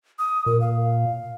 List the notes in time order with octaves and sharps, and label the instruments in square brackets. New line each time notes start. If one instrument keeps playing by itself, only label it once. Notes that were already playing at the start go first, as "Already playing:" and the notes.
[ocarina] D#6
[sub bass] A#2 [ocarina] A#4
[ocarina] F5